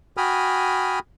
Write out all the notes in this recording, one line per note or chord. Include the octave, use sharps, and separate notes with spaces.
F#4 G5 G#5 B5 D#6 F6